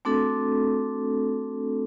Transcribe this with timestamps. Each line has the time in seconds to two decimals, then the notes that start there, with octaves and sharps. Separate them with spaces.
0.05 A3 C4 D4 F#4 A4